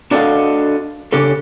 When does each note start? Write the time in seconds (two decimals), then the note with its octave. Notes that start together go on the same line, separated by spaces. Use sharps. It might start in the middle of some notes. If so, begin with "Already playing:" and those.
0.11 D4 F#4 A4 C5 D#5 F5
1.13 C#3 D4 G4 A4